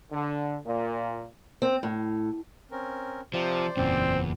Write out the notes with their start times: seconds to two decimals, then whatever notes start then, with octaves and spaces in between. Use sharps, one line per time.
0.12 D3
0.66 A#2
1.62 C4
1.83 A2
2.71 C4 C#4 A#4
3.34 C3 F3 C5 D5
3.77 F#1 E2 A#2 C4 C#4